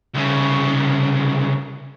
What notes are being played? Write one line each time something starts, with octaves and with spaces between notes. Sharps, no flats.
C2 C#3